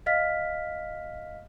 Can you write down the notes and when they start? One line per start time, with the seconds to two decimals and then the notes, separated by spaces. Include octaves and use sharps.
0.06 D#5 F5 F6 B6